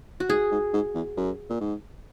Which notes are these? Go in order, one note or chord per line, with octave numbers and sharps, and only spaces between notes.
F#4
G#2 G#4
G#2
G#2
E2
F#2
A#2
G#2